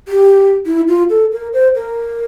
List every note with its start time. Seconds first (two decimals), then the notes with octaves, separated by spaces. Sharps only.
0.08 G4
0.66 E4
0.88 F4
1.10 A4
1.32 A#4
1.53 C5
1.75 A#4